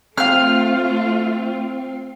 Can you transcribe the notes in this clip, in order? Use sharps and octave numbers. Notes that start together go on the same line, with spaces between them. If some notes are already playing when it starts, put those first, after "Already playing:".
A3 C4 F4 F5 F6